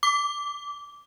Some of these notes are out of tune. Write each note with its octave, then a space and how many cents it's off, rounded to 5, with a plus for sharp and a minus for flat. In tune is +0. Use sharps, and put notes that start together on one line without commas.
D6 -15